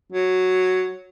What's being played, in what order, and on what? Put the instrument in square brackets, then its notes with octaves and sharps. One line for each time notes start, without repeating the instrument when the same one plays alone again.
[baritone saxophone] F#3